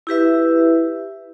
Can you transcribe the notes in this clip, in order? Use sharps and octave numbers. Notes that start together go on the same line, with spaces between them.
E4 G4 B4 E5